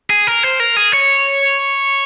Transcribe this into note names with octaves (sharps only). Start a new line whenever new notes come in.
G#4
A#4
C5
A#4
G#4
C#5